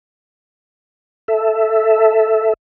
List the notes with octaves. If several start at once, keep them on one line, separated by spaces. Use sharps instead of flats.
A4 E5